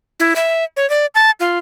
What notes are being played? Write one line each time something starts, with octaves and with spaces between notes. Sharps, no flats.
E4
E5
C#5
D5
A5
F4